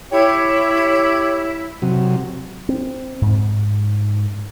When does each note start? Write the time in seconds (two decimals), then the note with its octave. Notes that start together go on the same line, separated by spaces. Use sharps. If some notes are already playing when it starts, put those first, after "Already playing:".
0.12 E4 G4 C#5
1.82 C3 F#3
2.69 C4
3.22 G#2